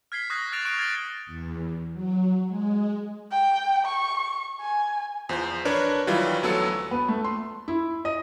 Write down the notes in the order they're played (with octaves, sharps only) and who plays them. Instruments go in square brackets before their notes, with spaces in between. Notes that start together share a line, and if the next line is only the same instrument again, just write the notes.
[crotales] F6 G#6 B6 C7 G7
C#6 D#6 F#6 G#6 A#6
F6 A6 C7 D7 E7 F7
C#6 F6 F#6 C#7 D7 F7
F6 G#6 A6 C7 D7 G7
[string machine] E2
F#3
G#3
[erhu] G5
C#6
G#5
[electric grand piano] E2 F3 C5 G6
D4 A#4 B4 C#5
D#3 E3 F#3 G3 F4
D2 F#3 B3 A4 E6 C#7
[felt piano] B3
A3
C6
E4
D#5